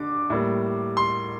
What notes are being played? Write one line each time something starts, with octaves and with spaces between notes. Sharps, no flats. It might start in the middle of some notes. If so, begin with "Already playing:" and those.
Already playing: D3 D6
A2 G3 A#3
C6